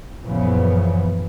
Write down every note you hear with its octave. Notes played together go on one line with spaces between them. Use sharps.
F#2 A#2 C#3 E3 F3 B3